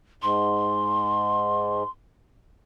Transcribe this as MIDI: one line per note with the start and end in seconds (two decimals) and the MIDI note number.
0.22 1.83 44
0.22 1.90 84